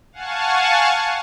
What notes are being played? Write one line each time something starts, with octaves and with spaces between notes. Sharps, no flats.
F5 F#5 G#5 A5 C#6